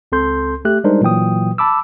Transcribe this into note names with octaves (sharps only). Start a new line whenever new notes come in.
C#2 C4 A4 C6 G6
A3 G4 F#6
G3 G#3 D4 D#4 A#4 C5
A#2 E3 F#3 G5 D#6
A5 B5 D6 E6